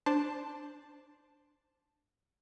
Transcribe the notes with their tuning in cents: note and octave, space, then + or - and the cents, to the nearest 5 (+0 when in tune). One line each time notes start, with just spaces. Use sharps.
D4 +0 C5 +0 A5 +0